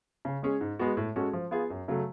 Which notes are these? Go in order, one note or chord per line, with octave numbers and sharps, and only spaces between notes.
C#3
G#3 C#4 G#4
G#2
G#3 B3 F#4
A2
G#3 C#4 F#4 A4
F3
B3 F4 G#4
F#2
C#3 F#3 A3